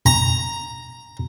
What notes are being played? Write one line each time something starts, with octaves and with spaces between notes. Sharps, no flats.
A#5